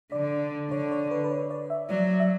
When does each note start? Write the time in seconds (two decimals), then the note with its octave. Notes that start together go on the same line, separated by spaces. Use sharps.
0.12 D3 D5
0.71 D3 C#5
0.91 C#5
1.11 B4
1.24 B4
1.31 C#5
1.50 D5
1.70 E5
1.89 F#3 D5
2.20 E5